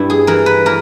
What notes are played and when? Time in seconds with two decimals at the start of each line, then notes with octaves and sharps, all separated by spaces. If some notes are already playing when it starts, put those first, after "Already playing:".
Already playing: G2 E4
0.10 G#4
0.27 E3 A#4
0.46 B4
0.66 E3 A#4